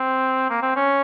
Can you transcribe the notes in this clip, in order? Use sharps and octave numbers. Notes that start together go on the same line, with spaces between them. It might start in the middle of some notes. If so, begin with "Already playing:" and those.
Already playing: C4
A#3
C4
C#4